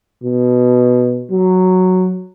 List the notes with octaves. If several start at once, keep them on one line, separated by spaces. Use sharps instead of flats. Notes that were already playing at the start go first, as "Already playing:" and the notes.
B2
F#3